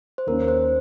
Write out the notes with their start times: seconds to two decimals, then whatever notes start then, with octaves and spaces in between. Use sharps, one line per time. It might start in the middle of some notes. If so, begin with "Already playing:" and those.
0.18 C5
0.27 D#2 D#3 A#3 C#4 A#4
0.48 C5